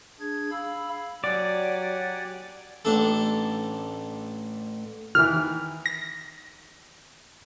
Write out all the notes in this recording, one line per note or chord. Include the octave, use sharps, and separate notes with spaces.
D4 G#4 G#6
F5 B5 E6
F#3 G4 D5 F#5 G#5
A1 D4 A4
D#3 E3 F6
A#6